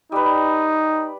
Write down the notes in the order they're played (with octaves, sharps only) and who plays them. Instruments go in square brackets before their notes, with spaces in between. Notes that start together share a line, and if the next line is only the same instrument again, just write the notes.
[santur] G3 B4 [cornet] D#4